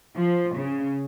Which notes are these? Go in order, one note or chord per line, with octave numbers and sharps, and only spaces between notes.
F3
C#3